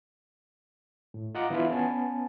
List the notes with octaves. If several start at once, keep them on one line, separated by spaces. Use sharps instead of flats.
A2
F4 D#5 F#5 A#5 D6
E3 B3 D4 E4 F4 B4
B3 C#4 G#5 A5